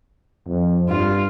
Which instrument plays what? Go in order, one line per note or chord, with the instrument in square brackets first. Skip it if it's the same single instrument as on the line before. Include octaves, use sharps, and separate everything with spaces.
[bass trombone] F2
[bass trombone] G2 [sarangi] F4